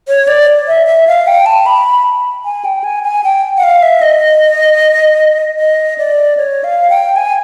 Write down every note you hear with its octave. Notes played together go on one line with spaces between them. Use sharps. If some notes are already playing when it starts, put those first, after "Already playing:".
C#5
D5
E5
E5
F5
G5
A5
B5
G#5
G5
G#5
G#5
G5
F#5
F5
E5
D#5
D#5
D5
C#5
F5
G5
G#5